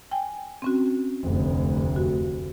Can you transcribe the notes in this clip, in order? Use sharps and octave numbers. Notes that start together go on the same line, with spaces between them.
G5 G#5
C4 C#4 F#4
F1 D2
F#4